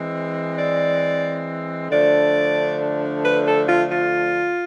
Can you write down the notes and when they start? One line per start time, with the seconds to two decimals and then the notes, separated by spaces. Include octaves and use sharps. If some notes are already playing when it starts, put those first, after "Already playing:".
Already playing: E3 G#3 C4
0.58 D5
1.90 D3 F3 A3 D4 D5
3.23 B4
3.45 A4
3.67 F4
3.90 F4